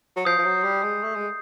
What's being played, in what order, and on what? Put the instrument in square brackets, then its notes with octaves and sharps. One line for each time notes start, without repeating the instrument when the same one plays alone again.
[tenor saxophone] F#3
[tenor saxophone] F3 [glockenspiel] D#6 G6 C7
[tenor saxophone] F3
F#3
G3
G#3
A3
G#3